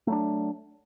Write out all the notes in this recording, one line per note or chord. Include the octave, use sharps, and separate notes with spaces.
F#3 A3 D4